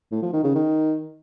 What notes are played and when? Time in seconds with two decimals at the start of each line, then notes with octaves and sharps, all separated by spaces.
0.11 A2
0.22 F3
0.33 D#3
0.44 C#3
0.55 D#3